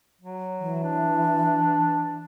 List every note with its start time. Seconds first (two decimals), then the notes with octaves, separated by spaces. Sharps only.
0.21 F#3
0.60 E3
0.83 D4